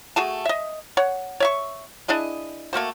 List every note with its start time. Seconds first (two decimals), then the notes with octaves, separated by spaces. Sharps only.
0.16 A3 F#4 G#4 A5
0.45 D#5 E5
0.97 C#5 F#5
1.40 C#5 E5 C#6
2.08 D4 E4 G#4 D#5
2.73 A3 A#3 F#4 C5